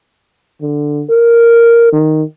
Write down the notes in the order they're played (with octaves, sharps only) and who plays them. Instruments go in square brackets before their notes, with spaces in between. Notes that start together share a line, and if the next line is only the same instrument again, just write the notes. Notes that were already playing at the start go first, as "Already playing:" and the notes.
[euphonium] D3
A#4
D#3